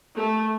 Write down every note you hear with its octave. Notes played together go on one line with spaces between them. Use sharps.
A3